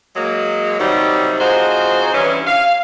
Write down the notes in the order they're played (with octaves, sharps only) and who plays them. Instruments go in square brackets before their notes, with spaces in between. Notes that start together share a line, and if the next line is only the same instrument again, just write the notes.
[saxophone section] F#3 G#3 A#3
C3 D#3 F#3 G3 D#4
F3 C4 D#4 F#4 G#4 C5
G2 E3 C#4
F5